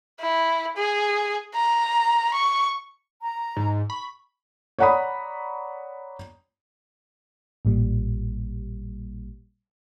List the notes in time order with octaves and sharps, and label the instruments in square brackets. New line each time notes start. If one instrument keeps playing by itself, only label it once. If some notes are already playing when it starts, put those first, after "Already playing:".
[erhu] E4
G#4
A#5
C#6
[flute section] A#5
[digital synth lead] G#2
[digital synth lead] B5 [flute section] C#6
[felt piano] C#5 D5 F#5 A#5 B5 D#6
[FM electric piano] A1 A#2 G3